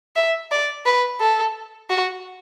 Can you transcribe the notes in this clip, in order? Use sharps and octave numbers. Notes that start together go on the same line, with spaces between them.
E5
D5
B4
A4
F#4